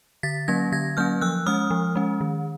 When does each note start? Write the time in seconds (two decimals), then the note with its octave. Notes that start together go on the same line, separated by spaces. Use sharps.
0.23 D3 A6 B6
0.48 F#3 A#3 C#4 G#6 A#6
0.72 D3 G#6 A#6
0.97 F#3 A#3 C#4 F6 G6
1.21 F3 E6 F#6
1.46 G#3 C#4 D#6 F6
1.71 F3
1.95 G#3 C#4
2.21 D#3